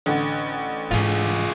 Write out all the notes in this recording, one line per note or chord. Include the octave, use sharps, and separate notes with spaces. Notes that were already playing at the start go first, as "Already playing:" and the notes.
A1 D3 F#5
G#2 E3 F4 G#4